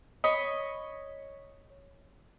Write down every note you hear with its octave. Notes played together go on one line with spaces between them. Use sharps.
C#5 D#5 B5